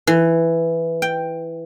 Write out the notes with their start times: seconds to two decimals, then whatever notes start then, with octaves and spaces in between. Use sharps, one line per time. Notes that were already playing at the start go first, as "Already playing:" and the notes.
0.07 E3
1.02 G5